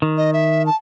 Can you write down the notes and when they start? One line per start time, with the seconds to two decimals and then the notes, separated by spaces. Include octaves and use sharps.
0.02 D#3
0.17 D#5
0.33 E5
0.66 A5